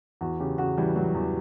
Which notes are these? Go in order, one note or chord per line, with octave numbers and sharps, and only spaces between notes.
E2 F#4
C#3 G4
C#3 F#4
E3 G3
E3 F#3
E2